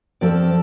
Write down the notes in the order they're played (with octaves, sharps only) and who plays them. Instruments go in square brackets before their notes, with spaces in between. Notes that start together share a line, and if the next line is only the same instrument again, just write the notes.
[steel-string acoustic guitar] F2 F3 C4 A4 D5